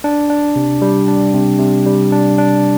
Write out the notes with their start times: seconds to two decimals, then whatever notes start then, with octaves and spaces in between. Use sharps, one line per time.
0.04 D4
0.30 D4
0.56 C3
0.82 G3
1.08 D4
1.34 C3
1.59 C3
1.86 G3
2.12 D4
2.38 D4